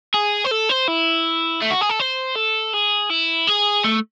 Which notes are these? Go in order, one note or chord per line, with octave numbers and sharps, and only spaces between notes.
G#4
C5
A4
C5
E4
A3
F#4
G#4
A4
C5
A4
G#4
E4
G#4
A3